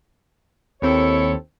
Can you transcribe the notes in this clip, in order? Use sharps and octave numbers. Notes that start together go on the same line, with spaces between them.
D#2 C4 E4 A4 C#5